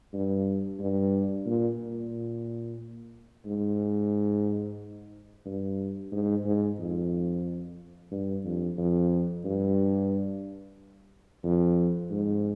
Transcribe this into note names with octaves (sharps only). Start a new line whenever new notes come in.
G2
G2
A#2
A#2
G#2
G2
G#2
G#2
F2
G2
F2
F2
G2
F2
G#2